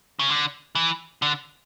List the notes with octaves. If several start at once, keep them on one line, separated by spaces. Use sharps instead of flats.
C#3
D3
E3
D3